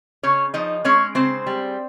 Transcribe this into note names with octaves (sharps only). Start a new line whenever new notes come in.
C#3 C#4 C#5
F3 D#4 D#5
G#3 C#4 C#5
C#3 C4 C5
G3